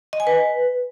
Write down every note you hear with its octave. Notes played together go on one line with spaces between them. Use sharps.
D#5
G#5
B4